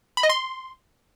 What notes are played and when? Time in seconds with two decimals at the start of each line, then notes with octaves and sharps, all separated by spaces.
0.17 B5
0.23 D#5
0.29 C6